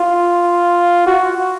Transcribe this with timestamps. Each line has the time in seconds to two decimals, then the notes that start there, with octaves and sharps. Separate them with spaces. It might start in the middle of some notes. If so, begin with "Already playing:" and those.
Already playing: F4
1.07 F#4